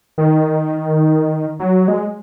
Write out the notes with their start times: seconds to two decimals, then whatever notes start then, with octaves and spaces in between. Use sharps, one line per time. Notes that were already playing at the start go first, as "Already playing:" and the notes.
0.18 D#3
1.60 F#3
1.88 G#3